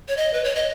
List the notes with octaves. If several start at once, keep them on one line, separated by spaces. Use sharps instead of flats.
C#5
D#5
B4
C#5
D#5